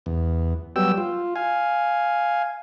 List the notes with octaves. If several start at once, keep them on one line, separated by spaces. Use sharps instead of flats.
E2
F#3 G3 B3 G5 E6
F4
F5 G#5